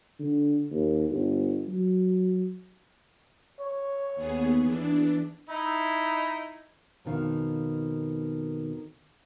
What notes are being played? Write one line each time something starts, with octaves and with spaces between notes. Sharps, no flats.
D3
D#2
G1
F#3
C#5
D#2 B3 G#4
E3 D4
D#4 E4
F2 B2 D#3 F5